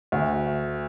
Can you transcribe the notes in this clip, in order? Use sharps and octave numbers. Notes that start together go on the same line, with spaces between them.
D2